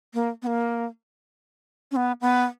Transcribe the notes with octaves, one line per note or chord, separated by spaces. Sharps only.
A#3
B3
A#3
C#4
B3
B3